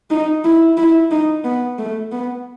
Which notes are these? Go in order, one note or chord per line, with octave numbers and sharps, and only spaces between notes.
D#4
E4
E4
D#4
B3
A3
B3